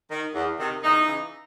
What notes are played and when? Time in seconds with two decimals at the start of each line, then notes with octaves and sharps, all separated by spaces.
0.11 D#3
0.34 E2
0.59 C3 D#3
0.82 E2 D#4
1.06 C#3 E3